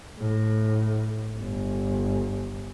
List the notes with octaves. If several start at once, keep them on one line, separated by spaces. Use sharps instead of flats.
A2
G1